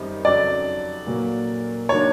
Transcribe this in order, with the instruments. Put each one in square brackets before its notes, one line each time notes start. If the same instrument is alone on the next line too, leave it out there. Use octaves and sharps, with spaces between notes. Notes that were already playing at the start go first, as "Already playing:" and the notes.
Already playing: [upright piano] F#2 D#3 G3 C4 D#4
[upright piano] F2 C#3 F#3 [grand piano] D5
[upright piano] A#2 F#3 A#3
[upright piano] D#3 F#3 A#3 D4 [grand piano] C#5